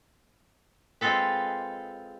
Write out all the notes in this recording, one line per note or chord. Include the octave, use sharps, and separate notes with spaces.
G#3 C4 F4 A4 B4